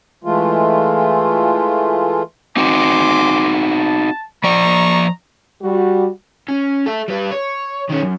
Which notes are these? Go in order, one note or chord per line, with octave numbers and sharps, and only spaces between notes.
E3 G#3 A3 F4
C4 D#4 F#4 G#5 C6 D6
A5
F3 D5 D#5 A#5 C#6
G3 F#4
C#4
A4 E5
G3 B4
C#5
D#3 C#4
F#2